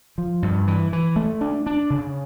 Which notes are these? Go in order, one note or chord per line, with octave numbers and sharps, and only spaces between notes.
F3
G2
E3
E3
A3
D4
D4
C#3